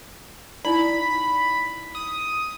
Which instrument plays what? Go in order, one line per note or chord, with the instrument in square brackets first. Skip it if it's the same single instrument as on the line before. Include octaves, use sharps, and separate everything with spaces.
[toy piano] D#4 E4 D5 [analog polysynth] B5
[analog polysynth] D#6